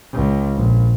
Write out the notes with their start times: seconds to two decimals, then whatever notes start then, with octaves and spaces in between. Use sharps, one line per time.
0.13 C#2
0.56 A#1